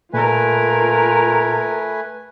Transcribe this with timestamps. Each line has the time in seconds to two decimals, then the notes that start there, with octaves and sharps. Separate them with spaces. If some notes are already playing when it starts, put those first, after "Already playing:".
0.14 A#2 A3 F4 A#4 B4 G#5